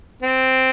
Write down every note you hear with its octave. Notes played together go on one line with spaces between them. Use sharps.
C4